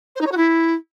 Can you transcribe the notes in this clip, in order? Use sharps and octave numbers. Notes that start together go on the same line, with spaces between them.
C5
D#4
C#5
F#4
E4